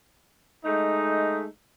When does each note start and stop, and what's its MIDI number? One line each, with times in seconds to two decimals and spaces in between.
0.65 1.45 56
0.65 1.45 57
0.65 1.45 63